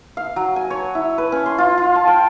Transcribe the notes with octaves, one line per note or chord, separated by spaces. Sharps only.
F5
F#3
G#5
C#5
E4
B4
C#4
C6
F4
F4
A5
G5